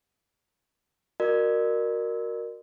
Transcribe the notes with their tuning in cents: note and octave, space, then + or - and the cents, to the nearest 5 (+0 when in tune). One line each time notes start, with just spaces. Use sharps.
F#4 -10 A#4 +0 D5 +45